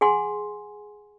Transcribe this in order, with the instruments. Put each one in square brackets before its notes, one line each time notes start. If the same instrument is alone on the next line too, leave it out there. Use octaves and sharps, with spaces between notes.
[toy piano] G#4 F#5 G#5 C6